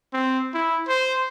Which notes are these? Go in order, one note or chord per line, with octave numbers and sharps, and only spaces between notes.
C4
E4
C5